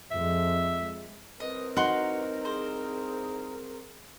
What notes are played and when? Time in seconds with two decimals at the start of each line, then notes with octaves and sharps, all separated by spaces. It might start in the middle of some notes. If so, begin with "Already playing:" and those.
0.11 F2 G#3 E5
1.40 C2 C4 A#4 B4 D#5
1.77 D#4 F#4 C6
2.45 G#4 C5